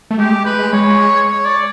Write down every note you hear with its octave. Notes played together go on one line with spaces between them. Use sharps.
A3
G#3 G4
G#3 B4
G#3
G#3 C#5
C#5
D5